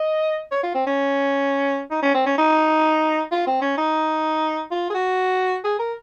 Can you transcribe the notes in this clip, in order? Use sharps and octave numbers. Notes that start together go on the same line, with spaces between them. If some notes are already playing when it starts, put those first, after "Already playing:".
Already playing: D#5
C#5
F4
C4
C#4
D#4
C#4
C4
C#4
D#4
F4
C4
C#4
D#4
F4
G#4
F#4
G#4
A#4